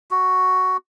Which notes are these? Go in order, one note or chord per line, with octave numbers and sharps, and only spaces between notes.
F#4